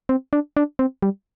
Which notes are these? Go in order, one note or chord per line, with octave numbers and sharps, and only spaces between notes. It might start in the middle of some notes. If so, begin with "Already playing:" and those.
C4
D4
D4
C4
G3